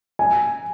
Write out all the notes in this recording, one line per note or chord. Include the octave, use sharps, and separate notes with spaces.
G#5